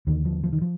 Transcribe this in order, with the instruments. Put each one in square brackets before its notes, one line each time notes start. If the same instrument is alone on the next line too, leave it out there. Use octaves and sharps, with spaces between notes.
[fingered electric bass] D#2 D3 D#3
F3
F3
D#3
F3